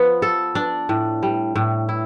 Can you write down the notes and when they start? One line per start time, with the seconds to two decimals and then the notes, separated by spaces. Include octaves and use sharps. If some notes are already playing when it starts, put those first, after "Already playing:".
Already playing: F3 B3
0.22 A4
0.55 D4
0.89 A2
1.23 G3
1.55 A2
1.89 E4